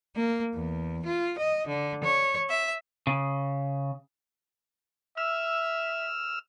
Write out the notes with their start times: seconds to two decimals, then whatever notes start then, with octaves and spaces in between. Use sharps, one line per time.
0.15 A#3
0.55 E2
1.05 F4
1.37 D#5
1.67 D3
2.03 C#5
2.49 E5
3.07 C#3
5.17 E5 E6 F6